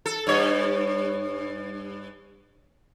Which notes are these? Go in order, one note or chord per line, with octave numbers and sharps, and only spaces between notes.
A4
G2 C#5